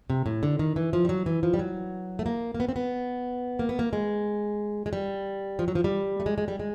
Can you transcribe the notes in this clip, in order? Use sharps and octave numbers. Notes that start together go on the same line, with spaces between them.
C3
A2
D3
D#3
E3
F3
G3
F#3
E3
F3
G3
F#3
A3
A#3
A#3
B3
C4
B3
A#3
B3
A#3
G#3
G#3
G3
F3
F#3
F3
G3
A3
G#3
G#3
G3
G#3